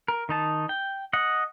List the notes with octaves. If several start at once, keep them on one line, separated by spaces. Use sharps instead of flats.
A#4
D#3 D#4 A5
G5
D#5 F#5